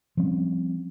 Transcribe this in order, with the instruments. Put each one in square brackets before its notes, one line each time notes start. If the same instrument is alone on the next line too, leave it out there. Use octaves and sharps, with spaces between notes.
[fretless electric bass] F3 G3 C4 C#4